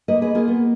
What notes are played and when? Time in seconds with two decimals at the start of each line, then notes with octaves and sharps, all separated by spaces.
0.08 A#3 B4 D#5
0.21 G#4 B4
0.35 A#3 F4 G#4
0.48 B3